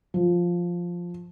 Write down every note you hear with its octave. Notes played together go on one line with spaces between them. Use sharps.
F3